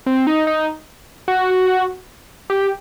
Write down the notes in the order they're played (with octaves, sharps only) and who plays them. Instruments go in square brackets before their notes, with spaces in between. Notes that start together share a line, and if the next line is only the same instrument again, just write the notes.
[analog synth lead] C4
D#4
D#4
F#4
G4